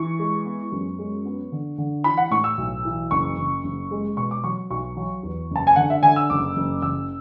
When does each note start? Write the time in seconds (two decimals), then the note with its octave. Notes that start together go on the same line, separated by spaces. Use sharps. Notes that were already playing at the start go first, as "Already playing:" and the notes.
Already playing: E3 C#6
0.19 G#3
0.46 B3
0.72 F#2
0.99 G#3
1.25 B3
1.52 D3
1.78 D3
2.04 E3 B5
2.18 F#5
2.31 A2 C#6
2.44 E6
2.58 B1
2.85 E3
3.11 F#1 C#6
3.37 F#1
3.64 F#1
3.91 G#3
4.17 B2 C#6
4.31 D6
4.44 F#3 C#6
4.70 B1 C#6
4.97 F#3
5.23 E2
5.51 F#1
5.56 A5
5.67 G#5
5.76 D3 F#5
5.90 E5
6.03 D3 G#5
6.16 E6
6.30 F#1 D6
6.56 F#1
6.82 F#1 E6